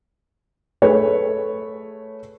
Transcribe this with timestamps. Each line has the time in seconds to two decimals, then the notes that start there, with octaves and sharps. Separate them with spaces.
0.82 A3 G#4 B4 C#5